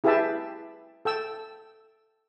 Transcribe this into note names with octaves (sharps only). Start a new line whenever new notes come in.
E4 G4 G#4 B4 E5 A5
A4 G5 E6